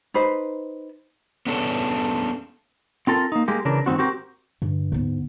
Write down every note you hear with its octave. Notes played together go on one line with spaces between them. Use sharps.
D#4 B4 C5
B3 C#4 D4 A4 C#5
C4 F4 A4 A#4
A#3 D#4
G#3 A#3 G4
C#3 E3 D4 A#4
G#2 D#3 G3 C4 F#4
C4 F#4 G4 A#4
G2 D3
D2 G#2 B3